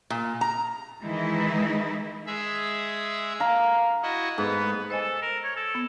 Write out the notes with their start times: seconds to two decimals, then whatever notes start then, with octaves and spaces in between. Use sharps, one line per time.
0.10 A#2
0.41 A#5
1.03 D#3 E3 G#3 D#4 E4
2.27 G#3 G#4 E5
3.40 F5 A#5
4.02 E4 F#4 D#5
4.38 G#2 B3 B4
4.90 A4 C5 D#5 G#5
5.22 A#4
5.44 C#5
5.57 A4
5.75 B3